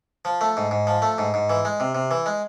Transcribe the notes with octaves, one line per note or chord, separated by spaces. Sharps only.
F3
A3
G#2
G#2
F3
A3
G#2
G#2
E3
G#3
C3
C3
E3
G#3